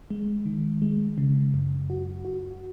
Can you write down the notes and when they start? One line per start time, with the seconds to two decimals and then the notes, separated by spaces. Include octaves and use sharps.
0.10 G#3
0.46 D#3
0.82 G#3
1.18 C#3
1.54 F#2
1.90 F#4
2.25 F#4